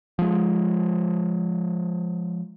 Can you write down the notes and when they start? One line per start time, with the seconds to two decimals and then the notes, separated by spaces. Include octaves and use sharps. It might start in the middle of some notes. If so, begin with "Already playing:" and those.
0.19 F3 G#3